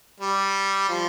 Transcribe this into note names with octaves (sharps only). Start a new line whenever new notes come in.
G3
F3